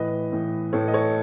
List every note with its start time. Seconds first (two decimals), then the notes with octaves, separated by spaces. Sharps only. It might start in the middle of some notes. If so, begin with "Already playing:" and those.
Already playing: A2 E3 B4 D#5
0.32 A2 E3
0.73 A2 E3 A4 C#5
0.88 D#5
0.93 A4 C#5